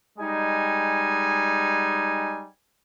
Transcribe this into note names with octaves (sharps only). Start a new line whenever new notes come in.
G3 G#3 D#4 G#5